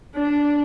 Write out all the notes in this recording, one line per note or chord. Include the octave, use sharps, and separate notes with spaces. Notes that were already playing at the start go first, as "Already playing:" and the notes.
D4